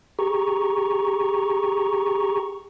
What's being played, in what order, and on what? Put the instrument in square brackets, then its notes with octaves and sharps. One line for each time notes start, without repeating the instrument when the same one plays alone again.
[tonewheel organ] G4 G#4 A#5 C#6